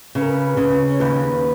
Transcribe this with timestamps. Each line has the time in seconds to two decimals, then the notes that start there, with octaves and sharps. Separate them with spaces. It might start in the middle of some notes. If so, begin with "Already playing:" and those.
0.15 C#3 B4
0.22 A#4
0.30 B4
0.57 C#3
0.87 C#5
0.99 D#2 B4